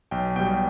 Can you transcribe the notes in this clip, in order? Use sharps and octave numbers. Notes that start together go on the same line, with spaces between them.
B1 G5
B2 G3 G5